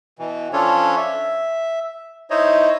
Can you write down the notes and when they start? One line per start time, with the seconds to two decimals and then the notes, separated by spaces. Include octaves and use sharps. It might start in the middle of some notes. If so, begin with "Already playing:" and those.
0.19 B2 E3
0.53 F3 C#4 D4 F4 A4 C#5
0.97 E5
2.31 D#4 E4 C5 C#5 D#5